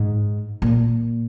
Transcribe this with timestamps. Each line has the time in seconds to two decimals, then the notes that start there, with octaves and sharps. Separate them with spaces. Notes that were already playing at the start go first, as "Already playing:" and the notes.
Already playing: G#2
0.62 A#2